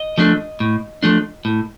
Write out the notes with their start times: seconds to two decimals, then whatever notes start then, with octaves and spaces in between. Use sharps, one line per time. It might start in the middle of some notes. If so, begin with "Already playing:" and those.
Already playing: D#5
0.18 F3 A3 D4
0.60 A2
1.03 F3 A3 D4
1.45 A2